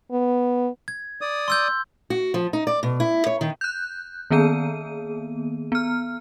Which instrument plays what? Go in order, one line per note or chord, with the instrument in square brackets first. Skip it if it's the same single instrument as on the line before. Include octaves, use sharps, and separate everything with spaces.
[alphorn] B3
[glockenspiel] G#6
[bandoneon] D5 D#6
[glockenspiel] C6 E6 G6
[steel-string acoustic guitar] F#4
F3
D#4
D5
B2
E4
C#5
D#3
[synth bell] F#6 G6
D#3 A#3 B3 G#4 D#7
B3 F6